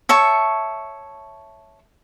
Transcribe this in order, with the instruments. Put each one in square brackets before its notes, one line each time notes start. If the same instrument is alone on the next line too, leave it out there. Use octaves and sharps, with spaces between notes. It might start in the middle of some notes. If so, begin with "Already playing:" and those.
[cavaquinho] C#5 E5 A5 C#6